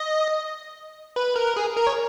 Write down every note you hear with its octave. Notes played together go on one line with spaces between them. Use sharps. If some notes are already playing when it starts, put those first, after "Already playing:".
Already playing: D#5
B4
A#4
G#4
A#4
C#5